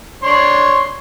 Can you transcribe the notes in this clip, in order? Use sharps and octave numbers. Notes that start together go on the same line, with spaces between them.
D4 C#5 C6